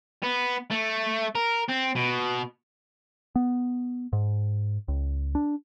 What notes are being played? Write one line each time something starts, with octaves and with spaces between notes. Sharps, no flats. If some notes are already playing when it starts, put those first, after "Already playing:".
B3
A3
A#4
C4
B2
B3
G#2
C#2
D4